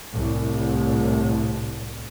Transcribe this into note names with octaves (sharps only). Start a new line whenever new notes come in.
C2 A2